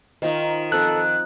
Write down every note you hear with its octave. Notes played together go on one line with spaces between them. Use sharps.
D#3 D#4 F4 C5
F3 C4 A4 F#6